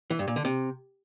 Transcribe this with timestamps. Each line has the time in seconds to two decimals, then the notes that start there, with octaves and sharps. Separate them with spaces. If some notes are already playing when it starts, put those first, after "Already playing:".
0.10 E3
0.19 G2
0.28 A#2
0.36 D3
0.45 C3